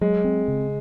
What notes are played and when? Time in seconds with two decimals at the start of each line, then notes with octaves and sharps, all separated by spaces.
0.01 F#3 G#3
0.24 C4
0.48 C#3